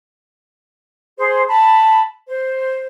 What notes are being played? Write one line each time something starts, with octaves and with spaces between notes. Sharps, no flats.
G#4 C5
A5 B5
C5